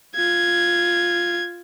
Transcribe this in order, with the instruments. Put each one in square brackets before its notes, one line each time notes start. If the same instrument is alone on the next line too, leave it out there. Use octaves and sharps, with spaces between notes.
[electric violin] F4 G#6